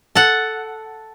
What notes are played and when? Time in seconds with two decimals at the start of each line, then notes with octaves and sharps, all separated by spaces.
0.15 A4 F#5